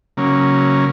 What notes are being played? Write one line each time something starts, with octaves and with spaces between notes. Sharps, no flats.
C#3 F#3 A#3 C#4